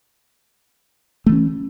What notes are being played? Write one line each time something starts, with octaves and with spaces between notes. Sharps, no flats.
E3 A3 C#4